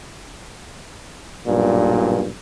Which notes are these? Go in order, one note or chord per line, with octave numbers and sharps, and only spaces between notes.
B1 G2 A#2